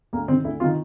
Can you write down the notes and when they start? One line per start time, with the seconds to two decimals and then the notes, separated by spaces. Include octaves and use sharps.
0.13 D2 A#3
0.28 D#3 C4
0.32 C3
0.44 D2 E4
0.60 C3 F4
0.64 D#3